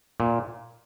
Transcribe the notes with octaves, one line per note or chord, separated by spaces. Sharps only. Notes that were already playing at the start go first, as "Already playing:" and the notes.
A#2